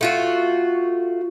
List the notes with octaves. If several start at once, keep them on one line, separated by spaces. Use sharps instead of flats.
A3 F4 F#4